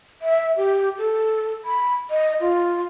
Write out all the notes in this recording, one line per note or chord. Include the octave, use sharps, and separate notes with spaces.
E5
G4
A4
B5
D#5
F4